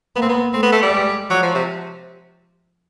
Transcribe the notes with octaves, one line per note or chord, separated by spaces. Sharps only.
A#3 B3
C4
B3
A3 C4
B3
A3
G3
G#3
F3 F#3
F3
C3